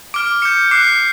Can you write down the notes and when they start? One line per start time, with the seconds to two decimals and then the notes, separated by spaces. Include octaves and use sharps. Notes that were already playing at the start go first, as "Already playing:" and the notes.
0.14 D6 F6 D7
0.42 D6 G6 C#7
0.71 D6 F#6 C7